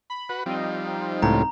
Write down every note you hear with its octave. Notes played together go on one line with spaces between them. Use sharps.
B5
F#4 B4
F3 G3 C4 D#4
C#2 A2 A#5